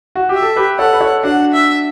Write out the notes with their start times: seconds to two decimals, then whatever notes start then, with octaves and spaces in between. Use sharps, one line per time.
0.15 F#4
0.29 G4 E5
0.42 A4
0.56 G4 B4
0.78 A4 C#5 F#5
0.93 B4
1.01 A4 C#5
1.23 D4 F#4 F#5
1.52 E5